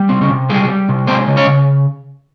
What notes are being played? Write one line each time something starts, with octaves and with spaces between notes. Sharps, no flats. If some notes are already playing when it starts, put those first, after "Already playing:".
Already playing: G3
C3 C4
C#3 C#4
C3
G3 G#3 G#4
G3
C3
G#3 C4 C5
C#3
C#4 C#5
C#3